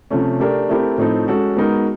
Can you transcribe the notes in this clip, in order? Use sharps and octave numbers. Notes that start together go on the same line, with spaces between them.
C3 F3 A3 C#4
A3 D4 G4 A#4
A3 C4 E4 G4 A#4
A2 F3 A3 C4 D#4
G#3 C#4 F#4 A4
G#3 B3 D#4 F#4 A#4